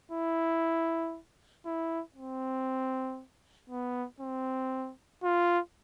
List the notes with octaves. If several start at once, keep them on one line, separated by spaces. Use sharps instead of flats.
E4
E4
C4
B3
C4
F4